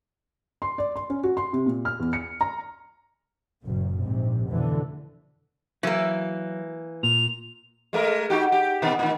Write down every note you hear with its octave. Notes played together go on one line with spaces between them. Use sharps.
C6
D5
C6
C#4
F#4
C6
C3
A#2
F6
E2
C#7
A#5
F#1 F#2 A#2
A#1 G#2 C3
F1 B2 D3 E3
E3 F#3 A#3
A#2 F7
G#3 A3 A#4
D#4 F#4 G4
G4
B2 D#3 B3
A2 D#3